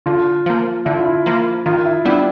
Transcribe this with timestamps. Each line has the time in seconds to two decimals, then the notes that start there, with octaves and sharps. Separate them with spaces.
0.06 D3 F4
0.46 F3 A#3
0.85 D3 E4
0.96 F4
1.06 E4
1.26 F3 A#3
1.66 D#3 F4
1.85 E4
2.05 G3 B3 D4 E4